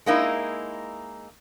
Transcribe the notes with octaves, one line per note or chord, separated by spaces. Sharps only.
G#3 A#3 D#4 E4